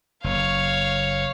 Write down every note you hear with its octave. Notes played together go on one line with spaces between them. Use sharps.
F#1 C#5 F5